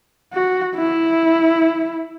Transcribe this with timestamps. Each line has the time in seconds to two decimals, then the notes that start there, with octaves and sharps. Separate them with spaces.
0.33 F#4
0.76 E4